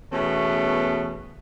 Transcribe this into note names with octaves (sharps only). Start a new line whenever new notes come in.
E2 B2 A3 C#4